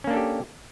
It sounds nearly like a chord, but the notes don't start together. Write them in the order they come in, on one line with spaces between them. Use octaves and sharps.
C#4 A#3 D4 A4 G4